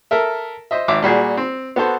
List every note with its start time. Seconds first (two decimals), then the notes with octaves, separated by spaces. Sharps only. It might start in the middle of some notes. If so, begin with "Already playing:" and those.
0.11 A4 A#4 E5
0.71 C5 D#5 E5
0.88 G#1 E5 D6
1.03 A#2 G3 F#4 G#4
1.37 C4
1.76 B3 F#4 A4 C5